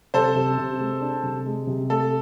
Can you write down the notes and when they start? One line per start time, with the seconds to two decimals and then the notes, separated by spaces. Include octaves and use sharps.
0.14 C3 A4 C5
0.35 C3
0.58 C3
0.81 G#3
1.01 D4
1.23 C3
1.46 G#3
1.67 C3
1.90 A3 A4